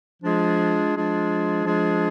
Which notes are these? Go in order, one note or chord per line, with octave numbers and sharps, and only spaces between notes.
F3 G#3 D4 F4 G#4
F3 G#3 D4 F4 G#4
F3 G#3 D4 F4 G#4